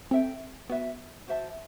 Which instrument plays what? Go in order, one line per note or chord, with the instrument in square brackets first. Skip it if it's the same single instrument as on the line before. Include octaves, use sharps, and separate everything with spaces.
[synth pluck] C4 [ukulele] A4 E5 G5
[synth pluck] B3 [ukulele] F#4 B4 E5
[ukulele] F#4 C5 E5 A5